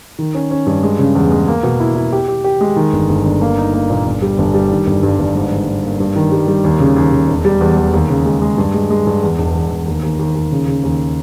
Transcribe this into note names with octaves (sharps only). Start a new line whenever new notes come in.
D#3
C#4
C#4
G2
G#3
C#3
E2
G#3
A#3
B2
E4
E4
G4
G4
G4
G#3
D#3
G1
G1
G1
A#3
D#4
A#3
A#2
G1
G3
G1
G3
D#3
G1
G2
G1
G#2
G#2
G#2
A#3
G2
D#3
G3
G3
D#2
C#3
D#2
C#3
E1
G3
E2
E2
D#2
C#3
G#3
G#3
G2
G#3
G#3
G2
E2
E1
E2
E1
D#2
D#2
D#2
D#2
C#3
C#3
D#2